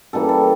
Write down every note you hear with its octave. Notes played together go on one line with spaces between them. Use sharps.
C#3 E3 G3 A#3 A4
A4